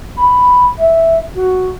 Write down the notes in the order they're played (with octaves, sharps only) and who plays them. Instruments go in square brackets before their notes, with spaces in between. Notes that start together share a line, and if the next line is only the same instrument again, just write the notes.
[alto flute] B5
E5
F#4